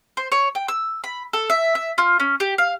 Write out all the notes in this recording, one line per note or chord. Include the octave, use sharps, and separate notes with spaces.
C5
C#5
G5
E6
B5
A4
E5
E5
F4
C#4
G4
F5